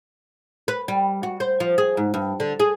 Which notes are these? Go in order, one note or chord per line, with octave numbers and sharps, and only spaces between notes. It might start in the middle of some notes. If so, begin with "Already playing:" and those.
B4
G3
F#4
C5
F3
G#4
G#2
G2
D3
G#4